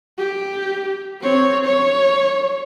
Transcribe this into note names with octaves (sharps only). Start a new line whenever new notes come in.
G4
C4 C#5
C#5